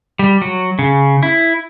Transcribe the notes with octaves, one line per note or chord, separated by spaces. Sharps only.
G3
F#3
C#3
E4